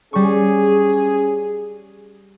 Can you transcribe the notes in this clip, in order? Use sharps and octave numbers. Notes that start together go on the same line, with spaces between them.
G3 C#4 G#4 C#6